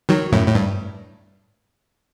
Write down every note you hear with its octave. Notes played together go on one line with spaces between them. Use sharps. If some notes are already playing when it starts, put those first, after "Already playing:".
D#3 F#3
F#2 A2
A2
G2